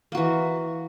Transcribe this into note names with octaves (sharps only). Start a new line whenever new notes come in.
E3 A#3 F#4